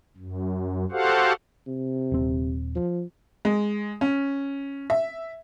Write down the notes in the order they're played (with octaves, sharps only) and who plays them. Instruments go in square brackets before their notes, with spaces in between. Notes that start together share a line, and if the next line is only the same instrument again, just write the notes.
[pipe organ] F#2
F#4 G4 A4 C5 F5 F#5
[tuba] C3
[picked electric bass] D#1 C4
[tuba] F3
[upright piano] G#3
C#4
E5